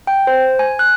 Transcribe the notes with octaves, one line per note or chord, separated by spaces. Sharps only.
G5
C5
G#5
F#6